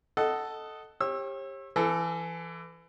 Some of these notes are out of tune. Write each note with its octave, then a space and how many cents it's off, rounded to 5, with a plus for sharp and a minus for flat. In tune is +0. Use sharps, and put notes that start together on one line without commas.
A4 +0 D#5 +0 F#5 +15
G4 +15 C#5 -40 E6 +0
E3 +25 A4 +0